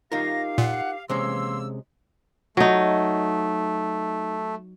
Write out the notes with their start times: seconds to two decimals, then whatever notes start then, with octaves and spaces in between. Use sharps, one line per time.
0.12 D#4 F4 G4 A#4 F5 A#6
0.58 A#2 F#5
1.09 C3 E3 G#3 A#3 C#4 C6 E6
2.57 F#3 A3 D#4